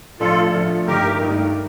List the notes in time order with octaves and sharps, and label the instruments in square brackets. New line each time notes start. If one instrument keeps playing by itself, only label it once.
[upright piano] A2 F3 A3 D4 [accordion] F4 A4
[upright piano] A2 F3 A3 D4
[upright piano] G2 D#3 A3 D#4 [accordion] G4 A#4
[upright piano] G2 D#3 A3 D#4